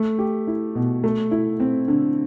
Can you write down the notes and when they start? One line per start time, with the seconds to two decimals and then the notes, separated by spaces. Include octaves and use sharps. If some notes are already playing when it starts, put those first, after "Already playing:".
Already playing: A3
0.19 G4
0.47 E4
0.75 B2
1.04 A3
1.31 E4
1.60 C4
1.88 D3